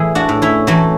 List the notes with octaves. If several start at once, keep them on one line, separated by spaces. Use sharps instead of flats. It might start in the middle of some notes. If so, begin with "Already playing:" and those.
Already playing: A2 E3 E4 G#4
D4 F#4
A2
C#4 E4
E3 F#3 A3